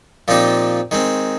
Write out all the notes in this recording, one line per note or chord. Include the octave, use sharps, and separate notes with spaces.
A#2 F3 C4 D#4 G4
D#3 G#3 C4